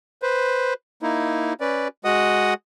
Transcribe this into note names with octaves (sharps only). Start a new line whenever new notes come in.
B4 C5
A#3 D#4 E4
C#4 B4 D5
G#3 F#4 D#5 F#5 D#6